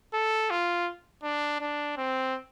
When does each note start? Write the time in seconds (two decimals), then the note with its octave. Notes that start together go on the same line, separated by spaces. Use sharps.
0.14 A4
0.50 F4
1.23 D4
1.61 D4
1.97 C4